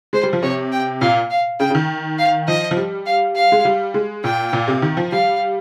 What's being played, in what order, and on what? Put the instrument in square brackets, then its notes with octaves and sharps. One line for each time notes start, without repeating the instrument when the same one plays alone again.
[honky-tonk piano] G#3 [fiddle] C5
[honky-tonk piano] G3
F3
[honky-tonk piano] C3 [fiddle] C#5
[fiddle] G5
[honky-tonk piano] A#2 [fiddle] F5
[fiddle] F5
[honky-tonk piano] C#3 [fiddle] G5
[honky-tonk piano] C#3
D#3
[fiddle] F5
[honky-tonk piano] F3 [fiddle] D#5
[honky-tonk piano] F3
G3
[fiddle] F5
F5
[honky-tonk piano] G#3
G3
G#3
[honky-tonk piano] A#2 [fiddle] G5
[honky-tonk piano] A#2
C3
D#3
F3
[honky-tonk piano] G3 [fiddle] F5